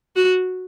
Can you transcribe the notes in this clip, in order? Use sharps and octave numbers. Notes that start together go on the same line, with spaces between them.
F#4